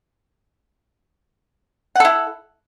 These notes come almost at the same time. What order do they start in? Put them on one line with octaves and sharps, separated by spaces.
F#5 A4 E4